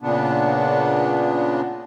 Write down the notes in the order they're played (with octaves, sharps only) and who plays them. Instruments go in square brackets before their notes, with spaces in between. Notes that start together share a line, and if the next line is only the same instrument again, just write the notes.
[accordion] A#2 C#3 B3 D4